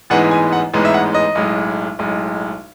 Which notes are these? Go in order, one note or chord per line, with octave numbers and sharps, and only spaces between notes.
A1 G#2 E3 G#3 B3 F#5
G#5
F#5
A1 G#2 E3 G#3 B3
E5
F#5
D#5
B1 A2 G#3
B1 A2 G#3